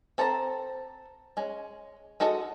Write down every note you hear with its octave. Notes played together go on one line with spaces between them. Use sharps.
C4 A4 C5 A5 A#5
G#3 C#4
G#3 F#4 A4 D#5